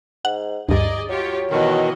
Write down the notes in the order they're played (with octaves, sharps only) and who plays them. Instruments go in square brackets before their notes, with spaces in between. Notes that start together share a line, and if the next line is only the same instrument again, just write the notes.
[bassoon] G#2 [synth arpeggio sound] F#5
[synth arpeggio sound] D2 G2 [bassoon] D#4 [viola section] G#4 D5 D#5
[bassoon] F#3 [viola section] F4 G4 C#5
[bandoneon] B2 D#3 [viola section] E3 F#4 D#5